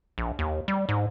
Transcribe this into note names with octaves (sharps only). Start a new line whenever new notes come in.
A#1
D#2
G3
G#2